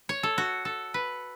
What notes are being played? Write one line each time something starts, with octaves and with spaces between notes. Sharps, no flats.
C#5
A4
F#4
A4
B4